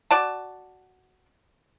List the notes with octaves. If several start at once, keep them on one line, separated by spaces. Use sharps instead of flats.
F#4 D5 A5